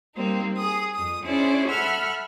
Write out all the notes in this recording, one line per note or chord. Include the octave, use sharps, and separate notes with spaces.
G3 A#3 C4 D#4
G#4 D#6
F2 D#6
C#4 D4 E4 G#4 C5 D5
A4 E5 F#5 B5 E6 F6